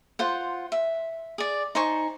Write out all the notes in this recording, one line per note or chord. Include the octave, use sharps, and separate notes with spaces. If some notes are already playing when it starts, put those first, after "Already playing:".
F4 C5 F#5
E5
G#4 D5
D#4 C5 G#5 C#6